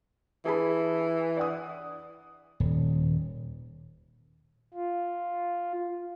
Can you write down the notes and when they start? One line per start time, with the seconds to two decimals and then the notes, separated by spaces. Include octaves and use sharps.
0.46 E3 G#4 A5 B5
1.37 D5 F#5 D#6
2.60 D#1
4.74 F4